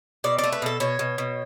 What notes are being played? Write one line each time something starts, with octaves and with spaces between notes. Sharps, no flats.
B2 D5
D5
A3
B4
B2 A4
B2 C#5
B2
B2